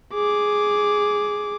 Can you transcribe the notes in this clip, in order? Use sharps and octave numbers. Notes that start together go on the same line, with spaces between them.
G#4 D6